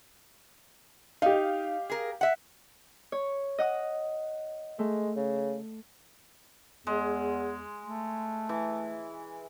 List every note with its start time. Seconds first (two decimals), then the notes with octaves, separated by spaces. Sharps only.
1.22 D#4 G4 F5
1.90 G#4 A#4
2.21 E5 F#5
3.12 C#5
3.58 D#5 F#5 D#6
4.79 G#3 A3
5.16 C#3
6.87 E2 G#3
7.83 A3
8.49 E3